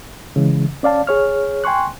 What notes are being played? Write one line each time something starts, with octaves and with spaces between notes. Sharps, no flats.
C#3 E3 G#3
C#4 D5 F5 A5
G#4 C#5 F6
G5 G#5 C6 C#6 F#6